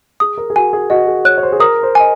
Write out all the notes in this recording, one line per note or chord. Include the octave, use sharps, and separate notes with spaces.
G#4 D#6
A#4
G#4
F#4 G#5
G#4
F#4 D#5
G#4
C#5 F#6
C#5
C5
G#4
A#4 D#6
C5
D#5 G#5